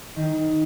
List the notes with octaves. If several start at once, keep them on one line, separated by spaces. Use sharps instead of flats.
D#3